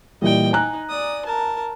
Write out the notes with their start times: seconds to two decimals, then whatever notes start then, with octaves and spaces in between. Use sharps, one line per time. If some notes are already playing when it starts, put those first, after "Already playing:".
0.22 A#2 E3 G3 D#5 G5
0.53 D#4 G#5 A#5 F#6
0.89 D5 D#6
1.26 A#4 A5